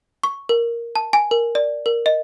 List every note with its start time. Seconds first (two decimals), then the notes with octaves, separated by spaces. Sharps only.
0.24 C#6
0.49 A#4
0.96 A5
1.13 G#5
1.31 A#4
1.55 D5
1.86 A#4
2.06 D#5